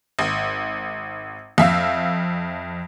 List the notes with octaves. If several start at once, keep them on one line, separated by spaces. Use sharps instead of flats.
G#1
F2 E5 F5 E6